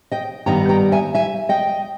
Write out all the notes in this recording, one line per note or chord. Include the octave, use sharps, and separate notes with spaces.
D#5 G5
G2 D#3 G3 B3 D#4 G5 A#5
G5 A#5
E5 G#5
E5 G#5
D#5 G5